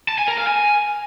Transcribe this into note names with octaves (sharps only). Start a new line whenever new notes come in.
A5
G#5
A#4
F5
G#5